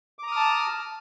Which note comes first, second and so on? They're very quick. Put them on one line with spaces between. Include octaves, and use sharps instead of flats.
D6 A#5 D#6 F6 A5